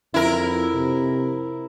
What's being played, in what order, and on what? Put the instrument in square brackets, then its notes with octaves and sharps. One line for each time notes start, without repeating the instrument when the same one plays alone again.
[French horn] F2 [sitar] E4 A#4
[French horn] C3